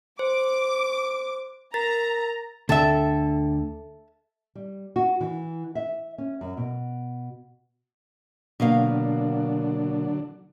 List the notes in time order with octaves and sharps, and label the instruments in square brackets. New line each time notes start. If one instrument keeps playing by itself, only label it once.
[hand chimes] C5 [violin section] D6
[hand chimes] A#4 A6 B6 [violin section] A#5
[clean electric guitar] D2 D3 G5 [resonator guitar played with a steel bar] A4 E5
[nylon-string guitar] G3
F#4
E3
E5
C#4
F#2
B2
[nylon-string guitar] B2 A#3 F5 [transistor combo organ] D3 F#3 D4